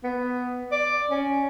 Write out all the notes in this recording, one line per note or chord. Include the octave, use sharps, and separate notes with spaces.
B3
D5
C#4